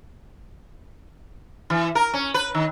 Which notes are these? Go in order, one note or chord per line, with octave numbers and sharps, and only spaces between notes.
E3
A#4
C#4
B4
D#3